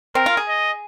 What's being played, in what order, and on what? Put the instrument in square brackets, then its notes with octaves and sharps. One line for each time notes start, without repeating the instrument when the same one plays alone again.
[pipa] C4 [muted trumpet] A#4
[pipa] F4
G#4
[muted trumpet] D#5